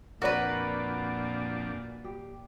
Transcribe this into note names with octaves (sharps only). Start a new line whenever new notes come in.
F2 A#2 D4 F#4 A#4 B4 D5
G4